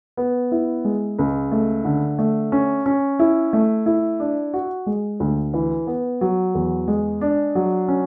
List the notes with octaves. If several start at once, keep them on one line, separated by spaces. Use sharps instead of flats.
B3
E4
G#3
C#2
A3
D3
A3
C#4
C#4
E4
A3
E4
D4
F#4
G#3
D2
E3
B3
F#3
E2
G#3
D4
F#3
C#4